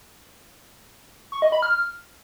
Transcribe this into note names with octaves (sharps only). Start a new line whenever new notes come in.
C#6
D#5
B5
F6